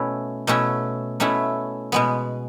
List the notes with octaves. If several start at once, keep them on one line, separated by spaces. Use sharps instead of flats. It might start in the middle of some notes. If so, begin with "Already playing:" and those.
Already playing: B2 A3 C#4 E4
B2 A3 C#4 E4
B2 A3 C#4 E4
B2 G#3 B3